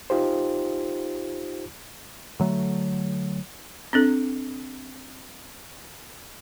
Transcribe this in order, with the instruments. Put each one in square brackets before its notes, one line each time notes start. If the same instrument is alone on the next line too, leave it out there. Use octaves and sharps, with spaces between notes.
[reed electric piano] D#4 F4 G4 C5
[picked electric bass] D3 F#3 A3
[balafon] C4 D4 A4